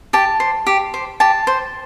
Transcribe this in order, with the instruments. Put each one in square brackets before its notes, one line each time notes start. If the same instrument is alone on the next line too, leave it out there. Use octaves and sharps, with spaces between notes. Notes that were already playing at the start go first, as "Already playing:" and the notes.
[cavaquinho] G4 A5
C5
G4
C5
G4 A5
C5